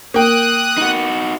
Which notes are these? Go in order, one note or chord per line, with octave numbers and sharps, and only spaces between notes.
A#3 G5 D#6 F#6
D#4 F#4